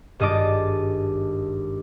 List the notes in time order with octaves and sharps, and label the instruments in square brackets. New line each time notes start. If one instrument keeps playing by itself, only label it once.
[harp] G#1 G2 D#5 A5 D6